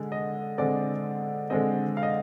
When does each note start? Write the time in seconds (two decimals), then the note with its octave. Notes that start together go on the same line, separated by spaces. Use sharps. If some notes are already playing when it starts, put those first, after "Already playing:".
Already playing: D3 G#3
0.12 D#5
0.58 D3 G#3 C4 D5
1.50 D3 G#3 C4 D#5
1.97 F5
2.03 D#5